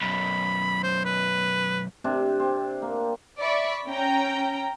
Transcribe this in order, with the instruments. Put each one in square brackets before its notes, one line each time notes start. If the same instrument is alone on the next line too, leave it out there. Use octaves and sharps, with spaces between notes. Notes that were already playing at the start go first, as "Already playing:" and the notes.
[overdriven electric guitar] B1 F#2 [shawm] B5
[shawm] C5
B4
[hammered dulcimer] C3 C4 D4
C4
A#3
[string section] D5 E5 B5 C#6
C#4 G5 A#5